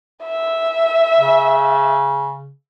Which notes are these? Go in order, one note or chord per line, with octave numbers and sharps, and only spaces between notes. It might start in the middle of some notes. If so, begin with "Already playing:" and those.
E5
C#3